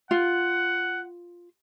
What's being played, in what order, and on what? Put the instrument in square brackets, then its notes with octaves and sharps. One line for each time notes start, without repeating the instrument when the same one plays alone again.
[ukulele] F4 [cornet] F#5